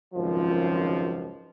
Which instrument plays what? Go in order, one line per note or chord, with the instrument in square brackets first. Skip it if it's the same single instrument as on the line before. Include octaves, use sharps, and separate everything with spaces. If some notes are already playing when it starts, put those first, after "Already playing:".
[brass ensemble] G#1 C#2 F#2 F3